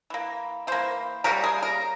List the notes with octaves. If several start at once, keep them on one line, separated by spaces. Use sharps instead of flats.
E3 A#3
E3 A#3 C5
C#3 G3 A#3 A#4
G#4
A#4